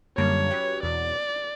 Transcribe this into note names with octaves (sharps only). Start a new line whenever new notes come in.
F#2 D3 G3 A#3 D4 C#5
F#3 C#4 G4 B4
E2 B2 F#3 D5